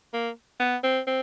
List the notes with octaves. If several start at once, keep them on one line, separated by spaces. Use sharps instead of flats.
A#3
B3
C4
C4